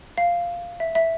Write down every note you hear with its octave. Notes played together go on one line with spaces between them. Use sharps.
F5
E5
E5